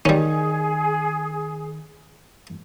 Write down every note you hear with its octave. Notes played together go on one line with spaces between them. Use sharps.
D#3 G3 C#4 G#4